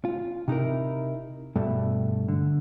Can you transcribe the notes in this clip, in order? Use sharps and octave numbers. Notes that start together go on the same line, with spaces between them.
F4
C3 D#4 E4 A#4
G2 B2 A3
D3